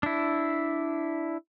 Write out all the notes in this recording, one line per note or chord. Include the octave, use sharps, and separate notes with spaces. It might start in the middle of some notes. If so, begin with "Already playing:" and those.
D4 E4